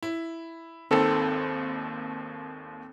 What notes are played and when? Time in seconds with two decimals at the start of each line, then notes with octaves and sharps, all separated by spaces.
0.03 E4
0.91 G#1 D#2 D#3 C4 A4